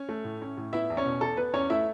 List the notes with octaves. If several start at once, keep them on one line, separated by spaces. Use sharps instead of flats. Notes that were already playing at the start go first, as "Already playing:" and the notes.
Already playing: C#4 C#5
A3
A2
C#4
A2
B3 E4 E5
E2
C#4 C#5
B2
E2 A4
B3 B4
E2 C#4 C#5
A3 E4 E5